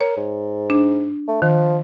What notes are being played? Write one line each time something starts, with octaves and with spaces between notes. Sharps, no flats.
A#4 C#5
G#2
D4
A3
D#3 F3